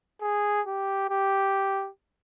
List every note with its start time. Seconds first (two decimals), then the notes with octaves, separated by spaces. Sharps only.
0.22 G#4
0.67 G4
1.10 G4